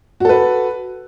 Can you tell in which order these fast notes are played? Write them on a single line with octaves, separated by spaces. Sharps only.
F#4 A4 B4